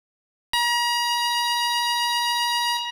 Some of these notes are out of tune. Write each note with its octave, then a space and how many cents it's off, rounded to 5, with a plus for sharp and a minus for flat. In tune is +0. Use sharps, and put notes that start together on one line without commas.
A#5 +40